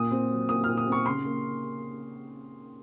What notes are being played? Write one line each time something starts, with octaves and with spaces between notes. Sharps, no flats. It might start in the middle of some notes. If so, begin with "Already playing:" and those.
Already playing: A#2 D#6
C4
F#3
A#2 D#6
A#2 F6
D#6
C4 C#6
C#3 C6
A#3